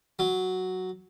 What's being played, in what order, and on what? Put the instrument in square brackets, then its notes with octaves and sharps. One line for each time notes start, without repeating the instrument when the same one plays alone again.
[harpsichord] F#3